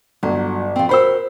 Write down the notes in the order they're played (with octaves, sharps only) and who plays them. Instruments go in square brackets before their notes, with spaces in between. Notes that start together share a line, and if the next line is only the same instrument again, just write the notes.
[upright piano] G1 [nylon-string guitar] F#3
[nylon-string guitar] F3 C4
[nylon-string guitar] F#4 A#4 C5 [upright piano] B5 E6